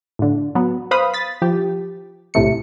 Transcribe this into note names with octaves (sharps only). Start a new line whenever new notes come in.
A2 D3
F#3 B3
B4 C5 F5 B5 D#6
A6 B6
F3 G4
A#1 A2 C3 A3 C#7